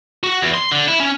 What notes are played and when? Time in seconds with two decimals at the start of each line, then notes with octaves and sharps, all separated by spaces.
0.24 F#4
0.42 E2
0.54 C6
0.72 D3
0.88 E4
1.00 C#4